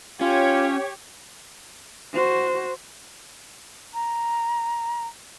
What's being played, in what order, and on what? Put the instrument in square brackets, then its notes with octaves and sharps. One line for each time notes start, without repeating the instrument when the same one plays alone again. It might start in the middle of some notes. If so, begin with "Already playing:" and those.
[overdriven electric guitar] C#4 [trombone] F4 [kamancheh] G4 C#5
[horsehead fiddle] F#4 C5
[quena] A#5